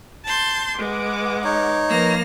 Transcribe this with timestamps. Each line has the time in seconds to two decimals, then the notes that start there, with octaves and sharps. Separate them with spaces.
0.25 A5 C6 G6
0.77 G#3 B4 F#5 D6
1.44 D#4 C#5
1.89 F3 A#3 B4 F6 A#6